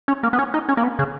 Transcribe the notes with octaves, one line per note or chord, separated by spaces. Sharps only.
C#4
A#3
B3
C#4
D#4
C#4
A#3
B3
C#3